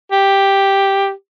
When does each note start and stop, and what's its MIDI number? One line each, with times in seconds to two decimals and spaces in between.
0.12 1.11 67